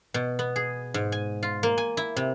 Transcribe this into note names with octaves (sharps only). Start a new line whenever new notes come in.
B2
B3
G#4
G#2
G#5
F4
A#3
G#5
E4
C3